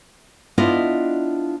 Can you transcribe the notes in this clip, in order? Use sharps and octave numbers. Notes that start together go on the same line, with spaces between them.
B3 D4 E4 F4 D5 D#5